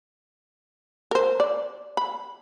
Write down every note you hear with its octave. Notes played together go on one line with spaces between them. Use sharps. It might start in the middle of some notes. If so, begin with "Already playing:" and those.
A#4 C5
D5
B5